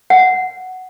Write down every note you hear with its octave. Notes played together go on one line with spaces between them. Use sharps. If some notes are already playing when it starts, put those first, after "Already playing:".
F#5